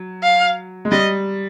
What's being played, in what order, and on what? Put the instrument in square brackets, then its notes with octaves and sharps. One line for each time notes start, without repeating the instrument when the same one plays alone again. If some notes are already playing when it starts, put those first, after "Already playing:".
Already playing: [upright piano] F#3
[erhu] F5
[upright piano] G#3
[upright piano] G3 [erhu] D#5